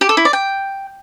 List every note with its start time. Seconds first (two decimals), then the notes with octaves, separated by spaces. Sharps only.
0.01 G4
0.09 A4
0.17 E4
0.25 D5
0.33 G5